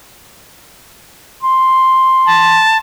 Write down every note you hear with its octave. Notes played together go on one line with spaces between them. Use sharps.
C6
A5